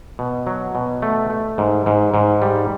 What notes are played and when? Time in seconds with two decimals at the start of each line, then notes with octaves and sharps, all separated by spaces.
0.19 B2
0.47 F#3
0.75 B2
1.02 A3
1.30 A3
1.58 G#2
1.86 G#2
2.14 G#2
2.42 G3